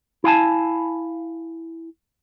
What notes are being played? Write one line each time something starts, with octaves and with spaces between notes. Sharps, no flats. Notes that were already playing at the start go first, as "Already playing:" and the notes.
E4 F5 G#5 A5